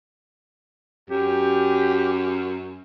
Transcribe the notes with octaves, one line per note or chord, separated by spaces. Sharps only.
F#2 G4